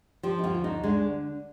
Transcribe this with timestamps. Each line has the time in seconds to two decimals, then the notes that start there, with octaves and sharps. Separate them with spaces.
0.23 F3 G4
0.39 D#4
0.44 D2 F4
0.54 F4
0.64 D2 D#4
0.83 D3 G#3